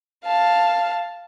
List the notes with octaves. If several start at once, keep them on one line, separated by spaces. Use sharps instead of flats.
F5 A5